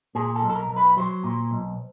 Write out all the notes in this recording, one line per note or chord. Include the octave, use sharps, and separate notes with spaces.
A#2 G#4
A4
B1
A4
A#4
B1
B4
F#3 C5
A#2
B1